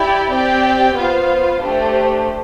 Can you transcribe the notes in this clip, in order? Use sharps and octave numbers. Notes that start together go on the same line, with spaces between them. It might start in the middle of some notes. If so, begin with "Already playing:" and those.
Already playing: E4 G4 D5 G5
C4 G4 D5 G5
B3 F4 C5 F5
A3 D4 G4 C5